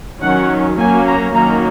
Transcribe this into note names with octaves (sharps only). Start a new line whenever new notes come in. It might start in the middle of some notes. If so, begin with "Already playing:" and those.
D#3 F#3 C#4 F#5
F#3 A#3 C#4 G#5
A#5
D#3 F#3 A#3 C#4 A#5